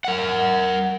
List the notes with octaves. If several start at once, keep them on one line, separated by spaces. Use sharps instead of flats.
A#4 F#5